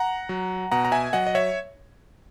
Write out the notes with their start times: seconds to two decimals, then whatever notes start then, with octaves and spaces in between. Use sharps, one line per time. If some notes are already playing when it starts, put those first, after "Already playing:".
Already playing: F#5 A#5
0.29 F#3
0.71 B2 F#5 A#5
0.85 A#5
0.92 E5 G#5
1.13 F#3 D#5 F#5
1.27 D#5
1.35 C#5 E5